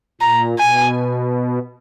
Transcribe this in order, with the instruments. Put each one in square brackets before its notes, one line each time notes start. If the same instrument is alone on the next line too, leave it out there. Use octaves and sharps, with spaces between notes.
[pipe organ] A#2 [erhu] A#5
[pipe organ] B2 [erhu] G#5